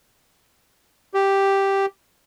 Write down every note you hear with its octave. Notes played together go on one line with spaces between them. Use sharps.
G4